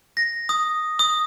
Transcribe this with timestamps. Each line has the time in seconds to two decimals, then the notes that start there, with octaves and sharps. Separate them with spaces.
0.17 A#6
0.49 D#6
0.99 D#6